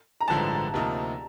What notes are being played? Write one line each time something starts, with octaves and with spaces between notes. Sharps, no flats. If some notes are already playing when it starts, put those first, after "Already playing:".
A#5
A1 G2 D3 F3 G#3 A5
D2 C3 F3 A#3 D#4